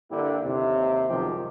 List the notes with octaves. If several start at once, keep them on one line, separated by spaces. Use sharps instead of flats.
G2 D3 G3 A#3 E4 G4
D#2 C3
C#2 F#2 C3 D#3 F3 G4